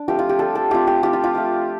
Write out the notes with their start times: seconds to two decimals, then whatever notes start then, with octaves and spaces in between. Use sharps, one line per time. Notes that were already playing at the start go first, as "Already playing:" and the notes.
Already playing: D4
0.08 F3 A3 C4 G4
0.19 F4
0.29 G4
0.39 G3 F4 A4
0.55 A4
0.71 A3 C4 F4 G4
0.87 G4
1.03 F3 C4 F4 G4
1.13 F4
1.24 F4
1.34 A3 F4